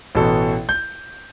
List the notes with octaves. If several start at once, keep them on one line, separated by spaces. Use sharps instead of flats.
A1 B2 A4
G6